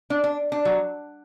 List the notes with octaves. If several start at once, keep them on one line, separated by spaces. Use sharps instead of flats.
D4
D4
D4
F#3